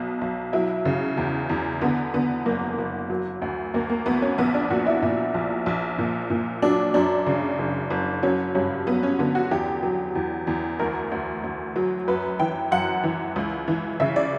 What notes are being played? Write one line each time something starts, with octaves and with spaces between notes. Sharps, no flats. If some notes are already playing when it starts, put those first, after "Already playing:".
Already playing: B1 B2
B1
F#3 E4
C#3
E2
E2
D3 B3
D3 B3
F#1 A#3
F#1
F#3
D2
D2 A#3
A#3
D2 B3
C#4
A#1 B3
D4
A#2 F#4
E4
A#2 E4
A#1
A#1
A#2
A#2
F#3 D4
F#2 D4
C#3
F#1
F#1
F#3 C#4
G2 C#4
F#3 B3
C#4
D3 B3
F#4
E2 G4
F#3
E2
E2
D2 A#4
D2
D2
F#3
F#2 B4
E3 G5
F#2 F#5
E3
C#2
E3
C#3 E5
D5